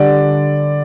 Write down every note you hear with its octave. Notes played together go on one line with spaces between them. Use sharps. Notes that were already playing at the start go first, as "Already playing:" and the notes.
Already playing: D3 G3 D5